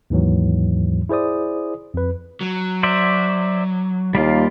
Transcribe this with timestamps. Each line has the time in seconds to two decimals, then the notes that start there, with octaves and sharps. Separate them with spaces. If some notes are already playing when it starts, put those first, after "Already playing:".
0.10 D#2 G#2 E3 F#3
1.09 E4 G#4 C5 D5 D#6
1.94 F2 B4
2.41 F#3
2.83 C5 D5 E5
4.15 D#2 G3 A#3 F4